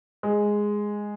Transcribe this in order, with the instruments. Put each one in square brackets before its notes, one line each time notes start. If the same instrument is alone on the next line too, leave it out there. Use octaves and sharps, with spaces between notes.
[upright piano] G#3